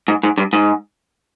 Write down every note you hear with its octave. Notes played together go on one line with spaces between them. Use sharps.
G#2
G#2
G2
G#2